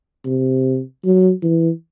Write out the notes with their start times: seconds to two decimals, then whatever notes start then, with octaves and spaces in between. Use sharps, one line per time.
0.26 C3
1.04 F#3
1.43 E3